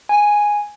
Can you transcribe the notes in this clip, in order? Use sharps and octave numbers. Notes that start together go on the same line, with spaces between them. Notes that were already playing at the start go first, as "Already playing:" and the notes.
G#5